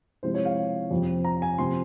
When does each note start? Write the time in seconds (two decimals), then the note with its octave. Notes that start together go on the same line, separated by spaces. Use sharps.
0.23 C3 F3 G#3 C4 E4 C5
0.34 C#5
0.45 F5
0.91 F2 C3 F3 C4
1.25 A#5
1.42 G#5
1.58 C3 F3 C4 C6